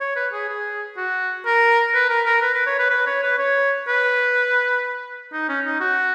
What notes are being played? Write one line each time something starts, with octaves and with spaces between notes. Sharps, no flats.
C#5
B4
G#4
G#4
F#4
A#4
B4
A#4
A#4
B4
B4
C#5
B4
B4
C#5
B4
C#5
B4
D#4
C#4
D#4
F#4